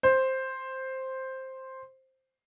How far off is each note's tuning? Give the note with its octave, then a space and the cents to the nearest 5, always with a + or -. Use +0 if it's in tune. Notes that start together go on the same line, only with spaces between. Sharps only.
C5 +5